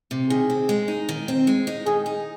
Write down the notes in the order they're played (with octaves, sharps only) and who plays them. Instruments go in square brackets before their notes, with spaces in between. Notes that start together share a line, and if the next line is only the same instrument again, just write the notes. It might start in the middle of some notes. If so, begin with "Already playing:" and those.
[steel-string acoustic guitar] C3
[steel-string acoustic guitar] D#3 [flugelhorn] G#4
[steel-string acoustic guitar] C4
G#3
D#4
D#3
C4
G#3
D#4
[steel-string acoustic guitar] D#3 [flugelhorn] G#4
[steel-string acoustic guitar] D#4